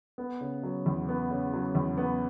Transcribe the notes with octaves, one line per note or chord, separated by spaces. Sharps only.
B3
C#3
F#3
E2
B3
C#3
F#3
E2
B3